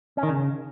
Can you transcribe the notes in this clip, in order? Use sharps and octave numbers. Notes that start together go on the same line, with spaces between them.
C#4
D#3
C#3